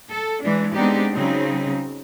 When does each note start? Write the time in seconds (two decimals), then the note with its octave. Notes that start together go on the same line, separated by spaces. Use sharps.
0.10 A4
0.44 E3 G#3 D4
0.74 G#3 B3 C4 D4 D#4 G4
1.13 C#3 F#3 C4 D#4